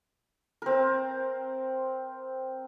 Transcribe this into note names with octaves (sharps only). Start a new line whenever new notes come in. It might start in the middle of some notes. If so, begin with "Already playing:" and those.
C4 A#4